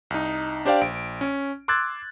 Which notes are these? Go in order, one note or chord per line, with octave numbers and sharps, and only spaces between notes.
C2 D#4
D4 G4 C5 D5 F5 G5
A#1 D7
C#4
C6 D6 E6 F#6 G#6 A6